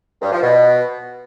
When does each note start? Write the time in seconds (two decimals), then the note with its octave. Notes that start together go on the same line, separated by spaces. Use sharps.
0.21 G2
0.31 F3
0.41 B2